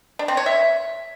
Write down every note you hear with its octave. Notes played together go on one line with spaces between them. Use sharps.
D4
C4
C#5
E5